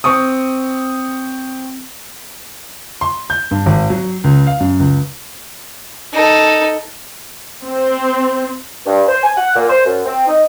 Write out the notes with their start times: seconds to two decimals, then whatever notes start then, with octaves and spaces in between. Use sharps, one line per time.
0.04 C4 C#6 D#6
3.01 C6
3.30 G6
3.51 G2
3.66 G#1
3.90 F#3
4.24 C#2
4.47 F5
4.60 F#2
4.80 C#2
6.13 D#4 A4
7.64 C4
8.86 G2
9.08 C5
9.23 G#5
9.37 F#5
9.56 A#2
9.70 C5
9.85 F#2
10.06 C4
10.27 D#4